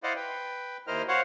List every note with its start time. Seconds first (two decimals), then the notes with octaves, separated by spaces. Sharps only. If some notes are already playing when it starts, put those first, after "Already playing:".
0.03 E4 C5 D5 D#5 F5 F#5
0.16 B4 G5
0.87 D#2 E4 A#4 C5 D#5 F6
1.08 F#4 C5 C#5 F5 F#5